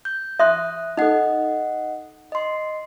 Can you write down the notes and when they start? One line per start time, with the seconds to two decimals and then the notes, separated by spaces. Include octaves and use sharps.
0.05 G6
0.39 E5 C6 D#6 F#6
0.97 D#4 A4 D#5 F#5
2.32 D#5 C6